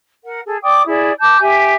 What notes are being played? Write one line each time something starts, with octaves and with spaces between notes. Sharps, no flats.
A#4 F#5
G#4 A4
D5 G5 D6 D#6
E4 G#4 D5
A5 D6 G6
G4 E5 G#5